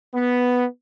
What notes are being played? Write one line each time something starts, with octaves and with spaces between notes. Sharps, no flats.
B3